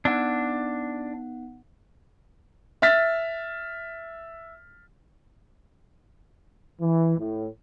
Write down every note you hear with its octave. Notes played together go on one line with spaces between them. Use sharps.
B3 D4 D#4 F#5
E5 F6 A6 B6
E3
A2